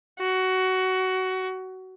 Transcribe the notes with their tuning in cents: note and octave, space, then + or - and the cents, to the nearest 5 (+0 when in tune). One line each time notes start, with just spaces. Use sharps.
F#4 +15